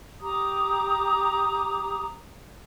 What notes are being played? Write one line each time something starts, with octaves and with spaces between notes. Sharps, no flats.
G4 A#5 D6 D#6